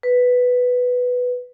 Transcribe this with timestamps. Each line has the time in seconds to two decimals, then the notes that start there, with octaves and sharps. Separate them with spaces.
0.03 B4